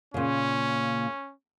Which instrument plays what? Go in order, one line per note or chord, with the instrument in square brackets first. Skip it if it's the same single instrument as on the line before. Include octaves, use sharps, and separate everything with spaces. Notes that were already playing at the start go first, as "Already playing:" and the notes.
[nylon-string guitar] A#2 C#3 [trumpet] C#4